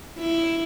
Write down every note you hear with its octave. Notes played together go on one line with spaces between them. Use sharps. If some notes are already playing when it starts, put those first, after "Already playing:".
E4